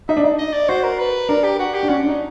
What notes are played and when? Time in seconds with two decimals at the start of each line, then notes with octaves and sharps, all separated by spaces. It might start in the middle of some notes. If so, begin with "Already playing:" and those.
0.09 D#4 E5
0.17 D4
0.24 D#4
0.39 D#5
0.53 D5
0.69 F#4 C5
0.84 A#4
0.99 B4
1.29 D4 A#4
1.44 G4
1.59 F#4
1.74 G4
1.83 D4
1.89 C#4 F#4
2.04 D4 D#4